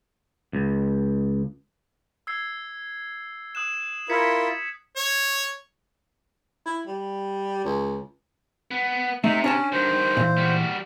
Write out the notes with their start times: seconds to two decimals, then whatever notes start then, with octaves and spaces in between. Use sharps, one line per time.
0.53 C#2
2.27 E6 G#6 C7
3.55 D#6 F#6 E7
4.09 E4 F4 A#4 G#6 B6 C#7
4.96 C#5
6.66 E4
6.87 G3
7.65 C#2
8.71 B3
9.24 C3 A3 D#4 E5
9.44 C#4 D4 C#5 A5
9.72 G2 D#3 C5
10.17 A#2 E3
10.37 G3 F#4